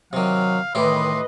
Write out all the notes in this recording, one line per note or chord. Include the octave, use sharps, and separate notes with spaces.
C3 D#3 F#3 F5
A2 D#3 E3 G4 B4 D#5 C6